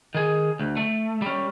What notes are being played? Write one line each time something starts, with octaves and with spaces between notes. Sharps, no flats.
D#3 G#4
D2
A3
G3 C#4